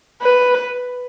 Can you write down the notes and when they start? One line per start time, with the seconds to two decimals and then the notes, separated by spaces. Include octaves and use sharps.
0.22 B4